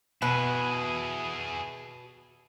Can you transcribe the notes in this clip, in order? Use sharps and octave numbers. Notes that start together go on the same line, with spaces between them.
B2 E4 G#4 B4